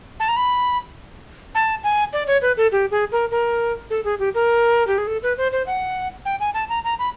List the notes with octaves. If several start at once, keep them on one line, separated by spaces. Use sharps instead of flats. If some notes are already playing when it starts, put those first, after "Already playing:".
A5
A#5
B5
A5
G#5
D5
C#5
B4
A4
G4
G#4
A#4
A#4
A4
G#4
G4
A#4
G4
G#4
A4
B4
C5
C5
F#5
G5
G#5
A5
A#5
A#5
B5